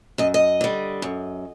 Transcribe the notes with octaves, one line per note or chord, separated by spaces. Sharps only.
F#2 D#5
D#5
D3 G3
F#2